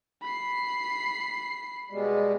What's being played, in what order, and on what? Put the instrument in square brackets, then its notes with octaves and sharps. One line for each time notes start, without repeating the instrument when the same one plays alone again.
[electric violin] B5 C7
[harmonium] B2 G3 G#3